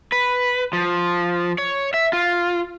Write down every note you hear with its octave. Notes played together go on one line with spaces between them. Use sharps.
B4
F3
C#5
E5
F4